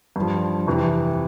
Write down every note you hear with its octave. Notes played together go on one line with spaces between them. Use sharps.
G2 F3
F2 C3 E3